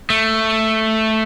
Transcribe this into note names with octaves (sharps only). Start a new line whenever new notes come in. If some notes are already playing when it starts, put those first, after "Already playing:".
A3